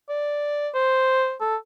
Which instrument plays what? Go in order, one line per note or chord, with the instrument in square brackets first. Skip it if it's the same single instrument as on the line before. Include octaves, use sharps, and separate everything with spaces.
[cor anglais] D5
C5
A4